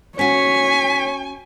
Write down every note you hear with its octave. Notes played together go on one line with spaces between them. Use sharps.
C#4 F#4 C#5 G#5 B6